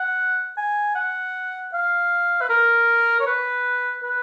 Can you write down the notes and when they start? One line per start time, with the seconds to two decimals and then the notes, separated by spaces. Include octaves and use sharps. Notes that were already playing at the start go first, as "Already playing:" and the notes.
Already playing: F#5
0.57 G#5
0.95 F#5
1.73 F5
2.41 B4
2.50 A#4
3.20 C#5
3.27 B4
4.04 B4